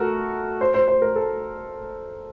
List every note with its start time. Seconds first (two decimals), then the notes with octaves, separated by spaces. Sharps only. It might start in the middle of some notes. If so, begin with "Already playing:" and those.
Already playing: A3 F#4 A4 A#4
0.61 C5
0.74 C5
0.88 C5
1.02 A#4
1.16 A4